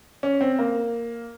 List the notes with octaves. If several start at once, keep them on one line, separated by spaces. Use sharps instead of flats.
C#4
C4
A#3